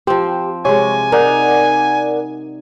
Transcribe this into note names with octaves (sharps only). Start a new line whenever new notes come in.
F3 C4 G4
C3 G#3 C#5 G#5
D#4 A#4 D5 F#5